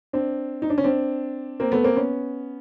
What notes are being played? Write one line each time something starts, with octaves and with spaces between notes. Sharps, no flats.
C4 D4
D#4
D4
C#4
C4 D4
A#3 C4
A3 B3
A#3 C4
B3 C#4